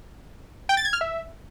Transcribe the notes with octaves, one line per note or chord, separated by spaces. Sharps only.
G5
A6
G#6
F6
E5